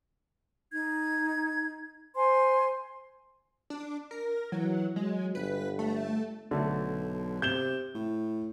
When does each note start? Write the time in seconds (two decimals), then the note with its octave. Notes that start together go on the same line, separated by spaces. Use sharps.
0.72 D#4 G#6
2.15 C5 G#5 C6
3.70 D4
4.11 A#4
4.52 E3 F#3
4.96 F#3 G#3
5.35 G1 B4
5.79 A3
6.51 B1 D3 A3
7.42 C3 G6 E7 G7
7.95 A2